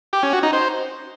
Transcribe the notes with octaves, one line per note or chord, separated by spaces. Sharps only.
G4
C#4
F#4
D#4
C5